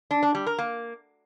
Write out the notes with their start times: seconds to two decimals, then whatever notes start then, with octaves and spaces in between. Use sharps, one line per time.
0.11 D4
0.23 D4
0.35 G3
0.47 A#4
0.58 A#3